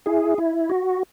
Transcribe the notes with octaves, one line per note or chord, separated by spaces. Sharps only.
E4 G#4
E4
F#4